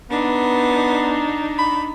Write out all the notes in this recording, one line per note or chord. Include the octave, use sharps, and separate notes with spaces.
B3 D4 D#4
B5